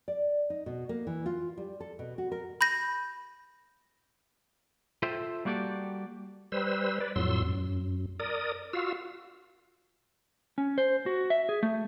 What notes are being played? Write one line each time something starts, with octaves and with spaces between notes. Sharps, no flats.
D5
D#4
B2
A#3
E3
F4
G3
A4
B2
F#4
A#4
B5 G6 A#6
F4 A4 C5 E5 G5
G3 A#3 F#4 G4 A4 D5
G3 B4 C5 E6
B4 D5
F2 A2 F#3 C6 E6
F#2
A#4 D5 D#6
F4 F#4 F5 E6
C#4
C5
F#4
E5
G#4
A3